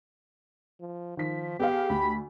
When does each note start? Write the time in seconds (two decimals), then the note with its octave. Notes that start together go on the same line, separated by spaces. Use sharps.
0.80 F3
1.17 D#3 F3 B6
1.60 B3 G4 G#4 F5
1.89 D2 B5